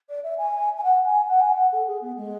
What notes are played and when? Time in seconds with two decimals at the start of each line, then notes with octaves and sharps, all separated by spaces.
0.09 D5
0.23 E5
0.38 G#5
0.78 G#5
0.83 F#5
1.05 G#5
1.27 F#5
1.40 G#5
1.52 F#5
1.72 A4
1.87 G#4
2.01 B3
2.16 G#3